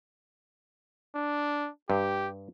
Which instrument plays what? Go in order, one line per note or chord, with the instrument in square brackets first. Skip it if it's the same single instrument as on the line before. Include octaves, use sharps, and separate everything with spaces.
[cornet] D4
[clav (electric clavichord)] G2 [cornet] G4